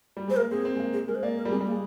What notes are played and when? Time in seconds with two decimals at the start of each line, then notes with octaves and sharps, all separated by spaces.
0.17 G3
0.28 G#3 C5
0.36 A#4
0.39 A#3
0.51 C4 G#4
0.65 C4
0.75 G#3
0.80 A#3
0.93 G#4
1.08 G#3 A#4
1.15 C5
1.23 A#3 D5
1.37 A#4
1.45 G3
1.51 G#3 C4
1.61 G3
1.66 A#3
1.71 G#3